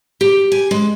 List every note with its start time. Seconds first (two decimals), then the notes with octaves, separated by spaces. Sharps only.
0.21 G4
0.52 G#5
0.71 G#3